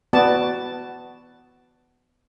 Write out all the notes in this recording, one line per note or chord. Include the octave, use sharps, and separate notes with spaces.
B3 F#4 D5 A5